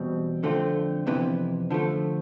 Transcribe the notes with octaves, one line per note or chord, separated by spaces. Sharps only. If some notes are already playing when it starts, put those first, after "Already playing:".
Already playing: E2 B2 G3 C4
F2 D3 A3 C4 F4
F2 C3 E3 B3
D3 F3 A3